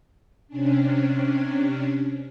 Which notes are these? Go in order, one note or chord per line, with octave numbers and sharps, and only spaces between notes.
C3 C#4 D4